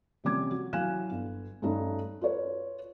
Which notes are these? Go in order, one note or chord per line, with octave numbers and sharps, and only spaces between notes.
C3 F3 G3 C#4 D6 G#6
F#4
F#3 E4 F5 G#5 F#6 E7
G1
G2 A3 C#4 D#4
F4 B4 C#5